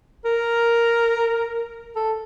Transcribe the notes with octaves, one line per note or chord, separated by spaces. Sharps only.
A#4
A4